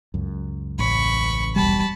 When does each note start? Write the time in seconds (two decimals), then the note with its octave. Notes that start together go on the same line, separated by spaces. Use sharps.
0.14 C#2 F#2
0.79 A1 B5 C#6
1.56 D#1 B1 E2 G3 A5 B5